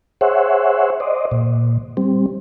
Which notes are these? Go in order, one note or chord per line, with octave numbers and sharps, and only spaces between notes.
G#4 C5 C#5 E5 F#5
C5 D5 D#5
A#2
G3 C4